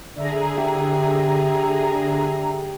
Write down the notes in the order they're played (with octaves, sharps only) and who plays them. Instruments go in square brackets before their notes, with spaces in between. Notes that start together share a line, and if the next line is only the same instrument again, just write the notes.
[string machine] D3 G#4 [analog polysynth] D4 E5 A#5
[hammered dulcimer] G4